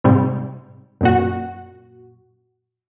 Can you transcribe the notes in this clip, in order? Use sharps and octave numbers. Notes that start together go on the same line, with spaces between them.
G#2 C3 G3
F#2 A#2 F#4